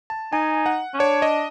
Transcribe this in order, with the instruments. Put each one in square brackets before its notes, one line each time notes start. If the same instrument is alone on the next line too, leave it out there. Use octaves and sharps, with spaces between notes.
[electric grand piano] A5
[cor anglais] D#4 [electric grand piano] G#5
[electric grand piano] F#5
[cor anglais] C#4
[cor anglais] D4 [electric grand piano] C#5
[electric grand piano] D#5